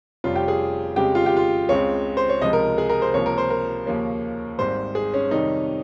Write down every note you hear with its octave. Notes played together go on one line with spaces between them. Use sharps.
F1 F2 C3 G3 C#4 F4
G4
G#4
F2 C#3 G#3 G4
F4
G4
F4
C#2 C#3 G#3 C4 C#5
C5
C#5
C#2 C3 F3 G#3 D#5
A#4
G#4
A#4
C5
C#2 C3 F3 A#3 C#5
A#4
C5
A#4
D#2 C#3 F3 A#3 C#4
G#1 G#2 G3 C5
G#4
C#4
F2 C3 D#3 G3 C#4 D#4